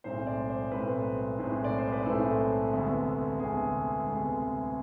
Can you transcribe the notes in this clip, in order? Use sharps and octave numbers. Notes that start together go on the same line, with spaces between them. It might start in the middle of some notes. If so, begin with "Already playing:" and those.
B1 A2 G#3 C4 C5
D5
C5
B1 A2 G#3 C4 B4
B1 A2 G#3 C4
D5
C5
B4
B1 A2 G#3 C4 A4
D2 C3 G#3 B3
D2 C3 G#3 B3 G#4
D2 C3 G#3 B3